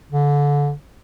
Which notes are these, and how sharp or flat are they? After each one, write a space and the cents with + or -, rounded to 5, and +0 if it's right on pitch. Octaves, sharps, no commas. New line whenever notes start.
D3 -25